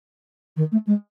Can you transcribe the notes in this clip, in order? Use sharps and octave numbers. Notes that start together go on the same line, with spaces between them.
D#3
A3
G#3